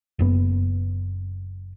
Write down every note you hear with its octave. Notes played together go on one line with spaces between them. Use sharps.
F#1 F#2 B3